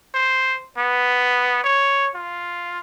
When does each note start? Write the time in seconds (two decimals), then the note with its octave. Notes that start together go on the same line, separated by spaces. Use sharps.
0.15 C5
0.78 B3
1.64 C#5
2.15 F4